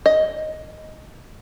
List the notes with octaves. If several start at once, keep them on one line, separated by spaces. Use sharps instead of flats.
D#5